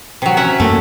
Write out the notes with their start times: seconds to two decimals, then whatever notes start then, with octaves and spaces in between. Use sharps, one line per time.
0.22 C3 F#3
0.37 C#4 E5 F#5
0.60 F#2 A3 A#3